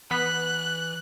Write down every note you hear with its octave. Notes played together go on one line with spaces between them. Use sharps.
E3 B3 F#6 B6